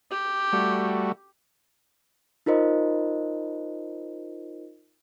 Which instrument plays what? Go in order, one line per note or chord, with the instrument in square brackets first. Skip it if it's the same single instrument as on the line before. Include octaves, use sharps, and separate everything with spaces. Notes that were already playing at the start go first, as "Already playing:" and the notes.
[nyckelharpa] G4
[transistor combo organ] G3 A3 F#4
[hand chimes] D#4 F4 A#4 C5 D#5